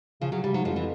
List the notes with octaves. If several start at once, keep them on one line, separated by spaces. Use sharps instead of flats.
C#3 F3
C#3 F#3
C#3 G3
G#2 F#3
F2 F3
E3